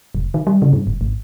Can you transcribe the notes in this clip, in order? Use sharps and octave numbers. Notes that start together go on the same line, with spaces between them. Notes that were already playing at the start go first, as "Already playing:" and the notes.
F1
D#3
G3
C#3
G2
F#1
G#1